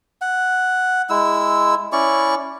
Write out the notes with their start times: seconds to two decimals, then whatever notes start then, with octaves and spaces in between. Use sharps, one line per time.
0.21 F#5
1.10 G#3 E4 E6
1.92 C#4 E4 D5 C#6